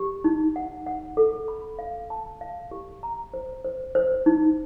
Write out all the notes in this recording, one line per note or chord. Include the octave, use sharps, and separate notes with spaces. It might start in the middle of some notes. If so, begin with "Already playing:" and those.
Already playing: G4
D#4
F#5
F#5
A4
B5
F5
A5
F5
G4
A#5
C5
C5
C5
D#4